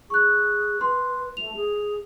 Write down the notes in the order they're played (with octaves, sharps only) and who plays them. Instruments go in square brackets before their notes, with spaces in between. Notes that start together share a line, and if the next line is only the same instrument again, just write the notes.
[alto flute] G#4 [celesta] C#6 F#6
[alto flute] B4 [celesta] C6
[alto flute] A3 [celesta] F7
[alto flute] G#4